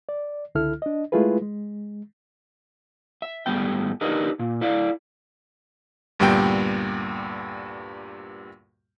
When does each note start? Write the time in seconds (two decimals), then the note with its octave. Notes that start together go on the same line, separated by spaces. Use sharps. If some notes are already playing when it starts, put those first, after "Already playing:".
0.09 D5
0.55 C#2 D3 E4 A4 F6
0.82 D4 D#5
1.12 G#3 A3 E4 F4 G#4 B4
1.42 G#3
3.22 E5
3.46 G#2 G3 A3 B3 G5
4.01 D4 D#4 G4 A#4 B4 D#5
4.39 A#2
4.61 E4 A4 D5 E5 F5
6.19 D2 G2 A#2 G3 B3 G5